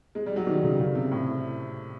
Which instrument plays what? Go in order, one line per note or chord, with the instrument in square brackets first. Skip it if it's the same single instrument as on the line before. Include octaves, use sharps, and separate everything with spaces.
[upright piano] G#3
G3
F#3
D#3
C#3
C#3
C3
A2